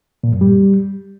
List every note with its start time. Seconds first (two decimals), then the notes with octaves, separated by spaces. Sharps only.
0.24 A#2
0.32 F#2
0.41 G3